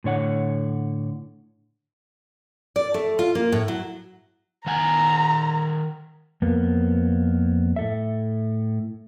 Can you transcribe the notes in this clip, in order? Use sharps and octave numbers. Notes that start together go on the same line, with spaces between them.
A2 D3 C#5 F#5
D5
A3
F4
A#3
A2
F#3
D#3 F#5 G#5 A#5
F2 A#3 B3
A2 A4 E5